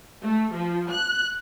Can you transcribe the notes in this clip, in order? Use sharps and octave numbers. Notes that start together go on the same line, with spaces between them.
A3
F3
F#6